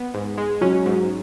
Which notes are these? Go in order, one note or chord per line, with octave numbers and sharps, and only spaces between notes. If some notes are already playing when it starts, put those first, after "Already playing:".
Already playing: B3
G#2
G#3
F#3 C#4
G#2